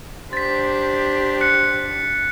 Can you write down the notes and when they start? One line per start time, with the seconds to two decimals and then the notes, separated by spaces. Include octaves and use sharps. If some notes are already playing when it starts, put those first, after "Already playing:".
0.33 D4 G4 C5 A6 B6
1.41 F#6 C#7